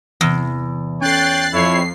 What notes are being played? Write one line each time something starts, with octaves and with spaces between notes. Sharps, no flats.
E2 C3 E3
C#4 A4 C#5 G5 F#6 A6 C7
F2 E4 C#5 C7